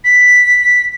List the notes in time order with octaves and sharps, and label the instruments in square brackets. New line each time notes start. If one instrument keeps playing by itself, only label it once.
[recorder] B6